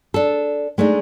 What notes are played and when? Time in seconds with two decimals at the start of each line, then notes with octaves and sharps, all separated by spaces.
0.14 D4 A4
0.78 G#3 A3 D4 D#4